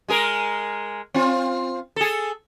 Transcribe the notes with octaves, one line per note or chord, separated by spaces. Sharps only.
G#3 G#4 A#4
C4 F4
G#4 A4